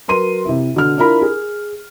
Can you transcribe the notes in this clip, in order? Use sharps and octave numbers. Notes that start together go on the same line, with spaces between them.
F#3 A#4 B4 C6 D#7
C3 E4
B2 D3 F6
D4 E4 F4 A#4 B5
G#4